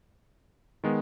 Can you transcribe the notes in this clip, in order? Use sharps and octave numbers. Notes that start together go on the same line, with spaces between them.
D#3 G#3 B3